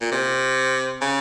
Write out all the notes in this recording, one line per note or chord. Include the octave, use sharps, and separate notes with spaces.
A#2
C3
C#3